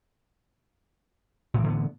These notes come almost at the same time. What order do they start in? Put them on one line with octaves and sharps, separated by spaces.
A2 E3 D3 B3